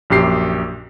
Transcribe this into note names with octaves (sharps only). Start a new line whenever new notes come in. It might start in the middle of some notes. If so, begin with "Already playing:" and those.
A#1 F#2 G4 C7